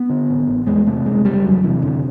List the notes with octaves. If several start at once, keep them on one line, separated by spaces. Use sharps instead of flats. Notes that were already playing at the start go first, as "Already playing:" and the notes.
Already playing: B3
D3
A1
A1
E2 G#3
C3 A3
F#1 G#3
F#1 G3
E2 F#3
C3 E3
F#1 D3